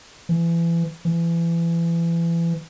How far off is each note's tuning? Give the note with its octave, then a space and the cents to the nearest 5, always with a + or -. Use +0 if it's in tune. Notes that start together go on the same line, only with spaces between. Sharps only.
E3 +30
E3 +30